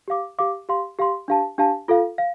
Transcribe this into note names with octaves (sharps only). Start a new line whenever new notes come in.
G4 F5 D6
G4 F5 D6
G4 F5 C6
G4 F5 C6
D4 G4 F5 A5
D4 G4 F5 A5
F4 A4 F5
F5